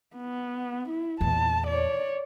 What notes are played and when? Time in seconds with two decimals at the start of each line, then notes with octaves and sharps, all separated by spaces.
0.16 B3
0.89 E4
1.21 E2 A#2 A5
1.67 C#5 D5